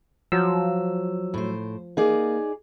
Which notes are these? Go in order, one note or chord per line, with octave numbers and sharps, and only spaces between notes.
F3 F#3 E6
A2 C5
A#3 D#4 G#4 D5